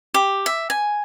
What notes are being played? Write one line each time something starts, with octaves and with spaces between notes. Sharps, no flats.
G4
E5
G#5